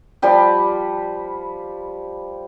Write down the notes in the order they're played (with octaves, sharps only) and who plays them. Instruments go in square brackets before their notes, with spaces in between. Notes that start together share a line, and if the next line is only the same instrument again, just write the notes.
[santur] F3 G3 G4 B5